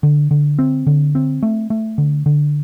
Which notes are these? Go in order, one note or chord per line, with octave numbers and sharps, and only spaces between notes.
D3
D3
C4
D3
C4
A3
A3
D3
D3